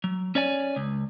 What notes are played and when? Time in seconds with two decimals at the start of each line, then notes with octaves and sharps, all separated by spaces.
0.04 F#3
0.35 C#4 C#5 D5 G#5
0.76 C#2